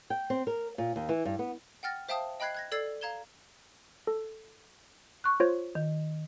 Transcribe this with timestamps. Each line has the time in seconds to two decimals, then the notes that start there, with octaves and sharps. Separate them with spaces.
0.10 G5
0.30 C4
0.47 A#4
0.78 A#2
0.96 D#2
1.09 E3
1.25 G2
1.39 B3
1.83 F#5 G5 F6 A6 A#6
2.09 C5 E5 F5 G5 A5 D#6
2.40 D#5 G5 B5 F#6 G#6 C7
2.55 F#6 G#6 A#6
2.72 A4 D5 E6 G#6 A6 C7
3.01 F5 A#5 G#6 E7 G7
4.07 A4
5.24 C#6 F#6
5.40 F4 C5 C#5
5.75 D#3